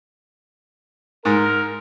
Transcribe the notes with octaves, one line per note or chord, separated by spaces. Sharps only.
G#2 A#4